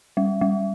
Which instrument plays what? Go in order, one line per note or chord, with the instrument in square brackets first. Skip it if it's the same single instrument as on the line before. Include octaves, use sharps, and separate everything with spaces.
[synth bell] G3
G3